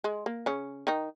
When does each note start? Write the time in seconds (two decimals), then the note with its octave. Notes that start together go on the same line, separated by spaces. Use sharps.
0.04 G#3
0.26 A#3
0.46 C#3 C#4
0.87 D#3 D#4